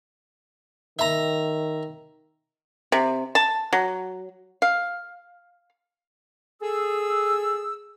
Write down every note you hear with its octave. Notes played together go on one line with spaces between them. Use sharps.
D#3 E5 A#5
C3
A5
F#3
F5
G#4 A4 E6